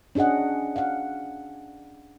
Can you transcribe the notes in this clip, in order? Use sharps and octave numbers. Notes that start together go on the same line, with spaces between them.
C#4 D4 G#4 D#5 F#5
F5 F#5